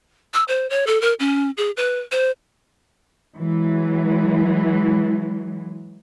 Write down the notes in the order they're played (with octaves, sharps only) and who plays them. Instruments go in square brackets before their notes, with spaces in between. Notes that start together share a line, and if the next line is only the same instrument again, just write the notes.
[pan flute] E6
C5
C#5
A4
A#4
C#4
G#4
B4
C5
[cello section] E3 F#3 G#3